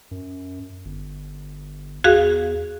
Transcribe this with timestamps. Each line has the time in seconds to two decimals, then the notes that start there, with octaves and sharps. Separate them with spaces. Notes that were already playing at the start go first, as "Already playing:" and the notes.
0.11 F#2
0.85 G1
2.04 E2 F#4 G#4 F5